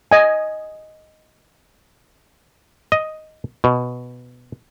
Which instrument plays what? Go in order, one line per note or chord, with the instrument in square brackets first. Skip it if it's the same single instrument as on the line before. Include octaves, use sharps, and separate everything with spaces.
[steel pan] D#5 G#5
[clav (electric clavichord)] D#5
B2